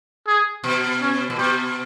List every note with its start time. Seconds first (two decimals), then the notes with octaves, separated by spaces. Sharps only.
0.27 G#4
0.64 B2
1.01 C#4
1.30 A#2
1.38 B2 G4